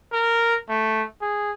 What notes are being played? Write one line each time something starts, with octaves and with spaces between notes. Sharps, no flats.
A#4
A3
G#4